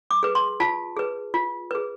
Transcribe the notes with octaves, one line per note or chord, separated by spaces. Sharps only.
D6
G#4 B4
C6
F4 A5
G#4 B4
F4
G#4 B4